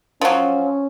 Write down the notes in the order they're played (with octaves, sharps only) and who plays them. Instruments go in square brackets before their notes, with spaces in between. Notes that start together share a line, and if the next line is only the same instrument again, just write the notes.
[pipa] F3 F#3 [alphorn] C#4